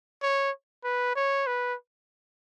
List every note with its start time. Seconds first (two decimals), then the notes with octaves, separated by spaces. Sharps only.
0.22 C#5
0.84 B4
1.16 C#5
1.47 B4